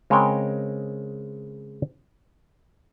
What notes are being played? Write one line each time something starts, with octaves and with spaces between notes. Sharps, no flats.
C#3 G#3 C4 A#4 C#5 G5